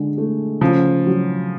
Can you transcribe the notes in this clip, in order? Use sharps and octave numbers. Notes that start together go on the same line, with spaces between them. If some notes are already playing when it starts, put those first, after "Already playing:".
Already playing: D3 G#3
A3
C#3 F3
F#3